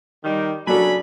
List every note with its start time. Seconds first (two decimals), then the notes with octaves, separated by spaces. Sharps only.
0.24 D#3 G3
0.67 C#3 F#3 D4 A4 G#5 B5